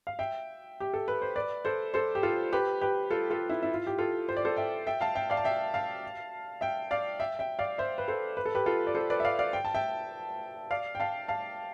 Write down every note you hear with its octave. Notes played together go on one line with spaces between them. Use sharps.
F5
E5 G5
G4
A4
B4
C5
B4 D5
A4 C5
A4 C5
G4
F4 A4
G4 B4
G4 B4
F4 A4
F4 A4
E4
E4
F4
G4
F4 A4
C5
D5
A4 C5
E5 G5
E5 G5
F5 A5
E5 G5
D5 F5
A5
E5 G5
F5 A5
E5 G5
D5 F5
E5 G5
E5 G5
D5 F5
C5 E5
B4
A4 C5
B4
A4
G4 B4
F4 A4
D5
A4 C5
B4 D5
E5
D5 F5
D5 F5
G5
A5
E5 G5
D5 F5
G5
F5 A5
F5 A5